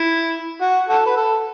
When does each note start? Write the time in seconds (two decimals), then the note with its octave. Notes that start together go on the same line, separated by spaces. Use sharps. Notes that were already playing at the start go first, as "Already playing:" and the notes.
Already playing: E4
0.61 F#4
0.89 F#4 A4
1.06 B4
1.17 A4